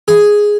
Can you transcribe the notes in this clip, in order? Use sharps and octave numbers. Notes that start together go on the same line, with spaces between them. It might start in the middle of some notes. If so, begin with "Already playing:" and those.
G#4